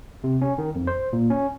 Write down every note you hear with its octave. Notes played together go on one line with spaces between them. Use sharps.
C3
C#4
D#3
F2
C5
A#2
C#4